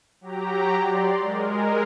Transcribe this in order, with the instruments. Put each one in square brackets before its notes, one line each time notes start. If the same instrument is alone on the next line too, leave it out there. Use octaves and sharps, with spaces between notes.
[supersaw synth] F#3 G4 A#5
D5 C6
G#3 A#4